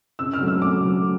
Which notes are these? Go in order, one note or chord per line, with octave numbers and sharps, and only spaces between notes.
C#3 E6
F6
F#3 A3
E6
C#3 D6
F#3 A3